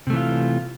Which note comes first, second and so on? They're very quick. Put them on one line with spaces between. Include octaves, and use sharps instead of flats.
C3 A3 E3 F4